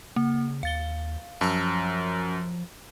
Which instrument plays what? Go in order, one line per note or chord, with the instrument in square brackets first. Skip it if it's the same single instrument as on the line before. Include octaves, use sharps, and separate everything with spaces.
[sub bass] C#3 [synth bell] A#3
[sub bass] D#2 [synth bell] F5 A6 G7
[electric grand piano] F#2 [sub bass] F3 [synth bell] A5 E6 A#6